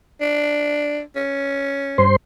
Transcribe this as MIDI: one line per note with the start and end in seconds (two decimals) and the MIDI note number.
0.21 1.01 62
1.16 2.08 61
1.98 2.16 43
1.98 2.16 72
1.98 2.16 84